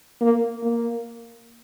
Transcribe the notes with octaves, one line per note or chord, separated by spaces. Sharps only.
A#3
A#3